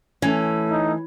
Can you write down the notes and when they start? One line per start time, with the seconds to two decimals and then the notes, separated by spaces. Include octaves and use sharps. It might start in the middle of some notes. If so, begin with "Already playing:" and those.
0.22 E3 A3 C#4
0.72 D#4